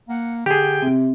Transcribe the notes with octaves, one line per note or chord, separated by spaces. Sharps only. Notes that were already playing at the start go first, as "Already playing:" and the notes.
A#3 F#5
D3 G4 G#4 G5
C3 C4